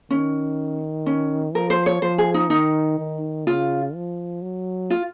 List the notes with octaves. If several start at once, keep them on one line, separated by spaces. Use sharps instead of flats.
D#3 C#4
C#4
F3 A#4
C5
C#5
F3 C5
G#4
D#4
D#3 D#4
D#3
C#3 F4
F3
F#3
F4